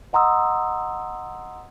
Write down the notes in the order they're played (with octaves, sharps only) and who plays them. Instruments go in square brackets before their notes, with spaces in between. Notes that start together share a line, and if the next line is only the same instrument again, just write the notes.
[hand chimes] D#5 F#5 A#5 C6 D#6 E6